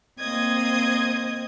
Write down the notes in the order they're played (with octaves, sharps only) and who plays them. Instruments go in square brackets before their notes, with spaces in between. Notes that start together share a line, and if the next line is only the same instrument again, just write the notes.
[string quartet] A#3 C4 D#5 D#6 G#6